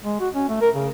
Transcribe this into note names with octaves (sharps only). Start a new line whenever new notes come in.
G#3
F#4
C#4
A3
A#4
C#3